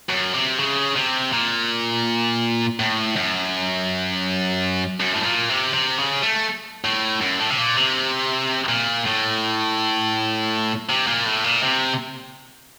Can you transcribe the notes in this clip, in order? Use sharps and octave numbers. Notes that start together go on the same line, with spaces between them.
F#2
C3
C#3
C3
A#2
A2
F#2
F#2
A2
A#2
C3
C3
C#3
A3
A2
F#2
A2
C3
A#2
C3
A#2
A2
C3
A#2
A2
A#2
C3